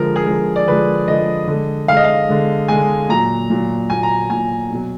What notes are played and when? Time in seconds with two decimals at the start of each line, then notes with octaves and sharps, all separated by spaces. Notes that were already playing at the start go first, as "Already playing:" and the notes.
Already playing: D3 F3 G#3 A#4
0.16 G#4
0.26 D3 F3 G#3 A#4
0.56 D5
0.67 D3 F3 G#3 B4
1.08 D3 F3 G#3 D#5
1.47 D3 G#3
1.88 D3 F5
1.92 G#3 D#5
2.04 F5
2.29 D3 G#3
2.68 D3 G#3 G#5
3.09 A#2 F#3 A#5
3.50 A#2 F#3
3.90 A#2 F#3 G#5
4.03 A#5
4.30 A#2 F#3 G#5
4.70 B2 F#3